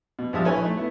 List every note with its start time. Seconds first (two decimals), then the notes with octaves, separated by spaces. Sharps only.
0.19 B2
0.33 G2 F3 G#3 E5 A5 D#6
0.45 A#1 E4 A4 B4 C#5 G#5
0.63 A3 D#4
0.76 A3 B3 E4